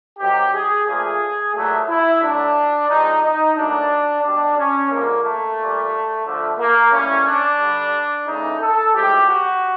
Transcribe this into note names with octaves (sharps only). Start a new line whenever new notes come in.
C3 D#3 F#3 G4
G#4
A#2 F3 A3 G#4
A#2 F#3 A3
E4
D3 F#3 A3 D4
C3 F3 G#3 D#4
D#4
A#2 F#3 A3 D4
B2 G3 D4
C#4
D3 F3 G#3 A#3
A3
A#2 G3
D3 F3 A3
A#3
A2 E3 G3 C#4
D4
D3 G3
C#3 E3 A3 D#4
A4
A2 F3 G#3 G4
F#4